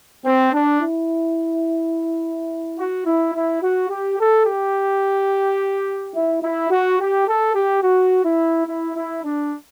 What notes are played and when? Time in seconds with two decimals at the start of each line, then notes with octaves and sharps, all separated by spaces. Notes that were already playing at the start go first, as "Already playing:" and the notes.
0.25 C4
0.53 D4
0.82 E4
2.77 F#4
3.06 E4
3.34 E4
3.62 F#4
3.90 G4
4.19 A4
4.46 G4
6.15 E4
6.43 E4
6.71 F#4
6.99 G4
7.27 A4
7.55 G4
7.83 F#4
8.25 E4
8.67 E4
8.95 E4
9.24 D4